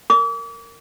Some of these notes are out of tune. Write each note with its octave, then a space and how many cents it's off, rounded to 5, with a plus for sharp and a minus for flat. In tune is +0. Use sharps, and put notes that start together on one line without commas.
A#4 -15 D6 -40